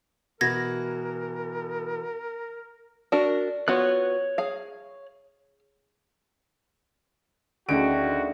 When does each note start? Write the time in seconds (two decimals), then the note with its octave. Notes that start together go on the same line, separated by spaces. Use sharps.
0.41 B2 E3 F#4 A#4 G#6 A#6
3.12 D4 F#4 A#4
3.68 B3 F4 F#4 C#5 F#6
4.38 G#4 F5
7.69 D2 D3 D#3 A3 C#4 F#4 G#4 D7